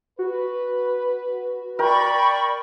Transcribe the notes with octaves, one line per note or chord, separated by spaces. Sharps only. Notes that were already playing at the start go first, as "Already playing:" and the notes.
F#4 B4
A#4 D5 G5 B5 C#6